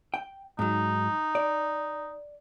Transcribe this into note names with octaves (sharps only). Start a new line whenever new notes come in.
G5
G#2 F#3 D#4
D5